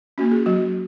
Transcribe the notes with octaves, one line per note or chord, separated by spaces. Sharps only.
A#3 C#4 F#4
G#4
F#3 F#4